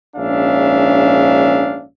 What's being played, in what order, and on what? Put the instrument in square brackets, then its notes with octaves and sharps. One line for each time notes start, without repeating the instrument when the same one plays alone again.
[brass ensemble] A#1 G#2 C#4 D4 E5 F5